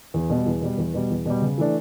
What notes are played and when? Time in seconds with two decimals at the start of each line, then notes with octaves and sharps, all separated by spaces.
0.14 E2
0.30 B2 G3
0.46 E2
0.62 B2 G3
0.78 E2
0.94 B2 G3
1.10 E2
1.26 B2 G3
1.42 C#3
1.58 E3 A3 D4